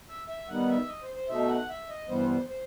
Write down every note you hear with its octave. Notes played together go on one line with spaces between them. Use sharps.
E5
E5
D#3 G3 B3 D#4 F#5
E5
D#5
C5
C5
B2 A3 D#4 E5
F#5
E5
D#5
G2 E3 G3 B3 C5
C5
C5